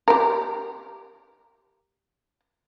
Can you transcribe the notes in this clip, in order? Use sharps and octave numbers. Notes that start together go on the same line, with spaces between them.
G4 A#4